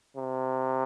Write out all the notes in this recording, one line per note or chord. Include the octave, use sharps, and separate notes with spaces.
C3